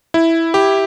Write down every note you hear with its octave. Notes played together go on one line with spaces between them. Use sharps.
E4
G4